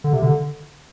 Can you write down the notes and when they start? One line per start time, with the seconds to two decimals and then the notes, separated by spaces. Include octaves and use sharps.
0.04 D3
0.13 C3
0.22 D3